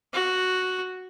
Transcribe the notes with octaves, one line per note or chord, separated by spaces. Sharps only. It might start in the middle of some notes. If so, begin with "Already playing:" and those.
F#4